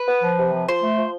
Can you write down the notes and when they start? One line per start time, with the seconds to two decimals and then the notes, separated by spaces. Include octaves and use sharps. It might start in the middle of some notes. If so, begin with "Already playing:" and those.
Already playing: B4
0.08 B3
0.23 F3
0.38 C3
0.53 F3
0.69 F3 C5
0.83 A3
0.97 F3